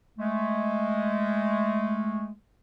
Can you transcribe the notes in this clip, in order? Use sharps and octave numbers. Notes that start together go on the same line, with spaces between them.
G#3 A3